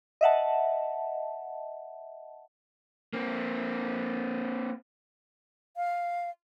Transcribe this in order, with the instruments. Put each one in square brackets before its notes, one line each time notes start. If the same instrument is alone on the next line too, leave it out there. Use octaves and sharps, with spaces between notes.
[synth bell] D#5 E5 F#5 A5
[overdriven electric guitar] A#3 C4
[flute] F5